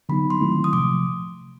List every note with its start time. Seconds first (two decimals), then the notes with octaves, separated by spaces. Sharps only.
0.09 D3 F#3 B3 D#4 B5
0.30 C6
0.41 D#3 F#3 A3 C4 E4
0.64 D#6
0.73 C3 F3 A3 D6